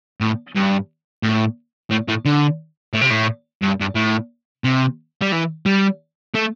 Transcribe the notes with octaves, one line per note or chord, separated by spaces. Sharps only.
A2
G2
A2
A2
A2
D3
A2
C3
A2
G2
G2
A2
C3
G3
E3
G3
A3